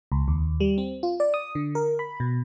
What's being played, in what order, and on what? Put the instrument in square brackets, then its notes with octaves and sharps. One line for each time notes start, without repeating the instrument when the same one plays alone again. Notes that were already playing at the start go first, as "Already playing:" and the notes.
[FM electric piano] C#2
D#2
G3
C4
F4
D5
D#6
D3
A#4
B5
B2